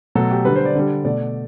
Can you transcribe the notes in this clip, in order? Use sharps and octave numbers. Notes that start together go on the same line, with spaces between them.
B2 F#3 A3 A4
G4
D3 G3 B4
C5
D5
D3 G3
B2 A3 D5